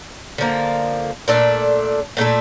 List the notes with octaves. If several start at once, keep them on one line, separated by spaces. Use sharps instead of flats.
D3 F3 A#3
A#2 A3 D4 A4
A#2 A3 D4 A4